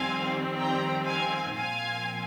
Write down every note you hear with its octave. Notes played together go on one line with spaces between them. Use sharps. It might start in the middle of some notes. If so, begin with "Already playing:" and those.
Already playing: F2 D#3 G3 C4 F5 G#5
G5 A#5
F5 G#5
A#2 F3 C4 F5 G#5